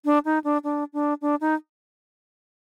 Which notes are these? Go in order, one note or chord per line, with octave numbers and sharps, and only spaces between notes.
D4
D#4
D4
D4
D4
D4
D#4